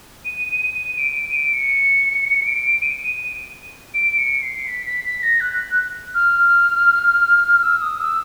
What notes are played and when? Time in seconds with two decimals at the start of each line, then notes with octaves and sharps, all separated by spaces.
0.25 D#7
0.48 D#7
0.74 D#7
0.98 D7
1.16 D#7
1.35 D7
1.53 C#7
2.46 D7
2.82 D#7
3.94 D7
4.18 C#7
4.42 C7
4.67 B6
4.86 B6
5.04 B6
5.23 A#6
5.40 F#6
6.14 F6
7.63 E6
7.81 D#6
8.00 E6